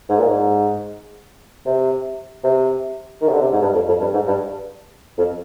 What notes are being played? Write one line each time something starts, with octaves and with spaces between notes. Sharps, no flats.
G#2
A#2
G#2
C3
C3
D#3
C3
D3
C3
G#2
G2
F2
F2
G2
G#2
G2
F2